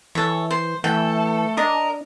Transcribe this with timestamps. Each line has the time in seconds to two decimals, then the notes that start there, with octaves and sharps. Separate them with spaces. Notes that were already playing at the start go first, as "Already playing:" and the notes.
0.15 E3 A4 C#5
0.51 C5
0.84 E3 A3 A4 G5
1.57 D4 A#4 D#5